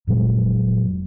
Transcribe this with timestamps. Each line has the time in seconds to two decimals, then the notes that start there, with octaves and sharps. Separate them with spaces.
0.07 F1 A#2 F#3 G#3